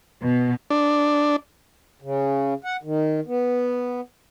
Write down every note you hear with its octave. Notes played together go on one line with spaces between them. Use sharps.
B2
D4
C#3
F#5
D#3
B3